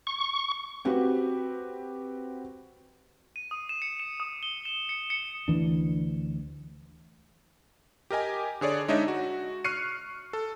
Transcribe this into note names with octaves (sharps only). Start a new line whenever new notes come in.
C#6
C4 F#4 G4 B4
D#7
D#6
E7
C#7
E7
D#6
G7
E7
C#7
C#7
D2 E3 D4
G4 A#4 D#5 G#5
D3 G#4 C#5 D5
G#3 D4 D#4 C#5 D#5 E5
F#4
C#6 F6 F#6 C7 C#7 D#7
A4